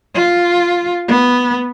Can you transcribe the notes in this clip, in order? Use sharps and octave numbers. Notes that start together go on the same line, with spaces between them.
F4
B3